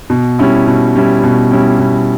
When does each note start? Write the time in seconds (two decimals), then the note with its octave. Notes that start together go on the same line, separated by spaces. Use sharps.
0.10 B2
0.39 G3 C#4 E4
0.67 B2
0.95 G3 C#4 E4
1.23 B2
1.51 G3 C#4 E4
1.79 B2